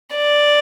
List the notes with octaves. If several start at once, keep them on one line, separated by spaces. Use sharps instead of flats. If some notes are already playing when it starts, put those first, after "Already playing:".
D5